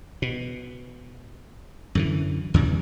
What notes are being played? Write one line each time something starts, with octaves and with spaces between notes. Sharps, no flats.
B2
F#2 D3 E3
E2 C#3 E3 G3